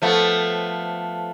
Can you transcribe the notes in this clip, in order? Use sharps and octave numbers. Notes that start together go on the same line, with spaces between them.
F3 A3 B3